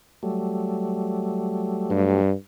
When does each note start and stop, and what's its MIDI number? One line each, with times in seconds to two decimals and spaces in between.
0.23 2.21 54
0.23 2.21 55
0.23 2.21 57
1.90 2.33 43